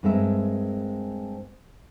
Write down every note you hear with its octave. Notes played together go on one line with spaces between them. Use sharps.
G2 G#3 C4 A#4 E5